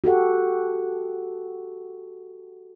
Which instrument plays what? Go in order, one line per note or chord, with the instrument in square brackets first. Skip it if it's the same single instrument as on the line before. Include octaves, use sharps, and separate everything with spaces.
[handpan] F#4 G4 A4 F#5